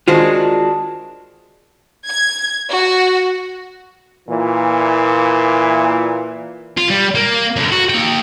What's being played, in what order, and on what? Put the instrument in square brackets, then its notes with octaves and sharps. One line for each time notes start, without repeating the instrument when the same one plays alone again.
[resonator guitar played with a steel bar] D#3 G#3 D4 [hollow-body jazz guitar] F4 F#4 C5
[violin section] G#6
F#4
[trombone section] A#2 E3
[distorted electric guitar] F4
G3
A#3
F#2 D3
F#4
A#3 G5